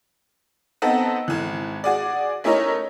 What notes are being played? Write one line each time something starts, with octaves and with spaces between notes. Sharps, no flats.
B3 C4 D#4 A4
G#1 E3
F#4 G#4 D5
A3 C#4 D#4 E4 A#4 C#5